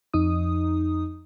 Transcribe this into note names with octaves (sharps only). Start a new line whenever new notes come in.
F2 D#4 D#6